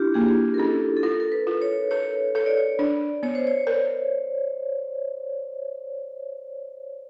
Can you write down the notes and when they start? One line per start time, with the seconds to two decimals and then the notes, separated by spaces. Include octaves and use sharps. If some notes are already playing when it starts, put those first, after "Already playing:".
Already playing: D4 E4 F4 G4
0.14 A#3 G#4
0.54 A#4
0.58 C#4 A4
0.97 A4
1.03 F4 A#4
1.20 A#4
1.32 B4
1.47 F4
1.62 C#5
1.91 A4 C#5
2.35 A4 C#5
2.46 D5
2.57 C#5
2.79 D4 D5
3.23 B3 C#5
3.35 C5
3.47 C#5
3.67 A#4